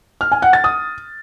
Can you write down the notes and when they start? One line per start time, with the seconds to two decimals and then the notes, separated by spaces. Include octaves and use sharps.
0.21 F6
0.32 G#5
0.42 F#5
0.53 A6
0.64 D#6